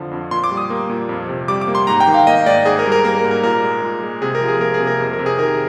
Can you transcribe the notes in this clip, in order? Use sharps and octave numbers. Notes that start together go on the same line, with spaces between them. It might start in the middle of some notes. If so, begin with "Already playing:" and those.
Already playing: F2 D3 F3
F2
A#2 C6
D6
G3
D#6
A#3
A#2
F2
C3
G3 D6
D6
A#3
C6
G#2 A#5
G5
D#3
F5
A#3 D#5
G#2 D5
G#2 G#4
A#4
G3
A#4
A#3 A#4
A#4
G#2
A#4
A#2 A#4
G#3
A#2
G#3
C3 G#4
A#4
F3
G#4
A#3 A#4
G#4
C3
A#4
F2
A#4
C3
G#4
D#3 A#4